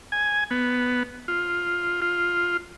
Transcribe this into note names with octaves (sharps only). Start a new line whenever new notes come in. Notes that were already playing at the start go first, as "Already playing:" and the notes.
G#5
B3
F4
F4